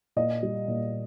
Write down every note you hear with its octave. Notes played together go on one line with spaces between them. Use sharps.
A#2 D#5
G3
A#2